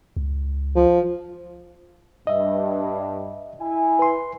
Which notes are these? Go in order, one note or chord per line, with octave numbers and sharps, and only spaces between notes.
C#2
F3
G2 D#5 E5
E4 G#5
B4 C6